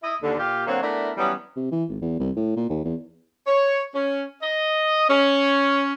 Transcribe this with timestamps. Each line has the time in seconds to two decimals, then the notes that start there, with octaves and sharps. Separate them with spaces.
0.03 E4 D#5
0.22 D#2 D3
0.38 A#2 F4 G4
0.67 D3 F#3 A#3 C4 C#5
0.82 A3 B3 D4 E4 A#4
1.17 E3 F#3 G3 B3 C#4
1.56 C3
1.71 E3
1.89 G#1
2.01 E2
2.19 C2
2.36 A2
2.56 A#2
2.69 D#2
2.84 E2
3.46 C#5
3.94 C#4
4.41 D#5
5.09 C#4